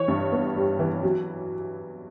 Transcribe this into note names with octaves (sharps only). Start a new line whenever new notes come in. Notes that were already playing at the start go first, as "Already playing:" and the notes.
Already playing: E3 C#5 C#6
G2
B3
G3
E3
F#3